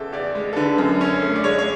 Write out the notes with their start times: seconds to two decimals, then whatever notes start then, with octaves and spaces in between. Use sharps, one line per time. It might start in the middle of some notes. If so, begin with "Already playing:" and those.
Already playing: E2 C#3 A4 E5
0.13 E2 D5
0.35 G#3
0.53 A4
0.56 D3 B4
0.78 F#2
1.01 C#4
1.22 A3
1.36 D5
1.44 G#3 C#5
1.58 C#5